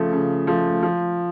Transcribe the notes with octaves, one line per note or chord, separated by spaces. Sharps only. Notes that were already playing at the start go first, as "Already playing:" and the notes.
Already playing: C#3 F3 A3
C#3
F3 A3
F3